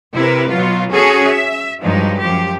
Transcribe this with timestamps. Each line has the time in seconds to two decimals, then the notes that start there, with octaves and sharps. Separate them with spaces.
0.14 C3 E4 A#4 B4
0.49 B2 F#3 F4
0.90 C#4 F#4 G#4 A4
1.26 E5
1.80 G2 F3 F#3 G#3 D#4
2.21 F#2 F3 G4